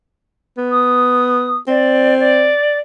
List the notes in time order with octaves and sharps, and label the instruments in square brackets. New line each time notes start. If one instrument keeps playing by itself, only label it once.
[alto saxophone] B3
[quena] D#6
[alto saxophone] C4 [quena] D5
[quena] D5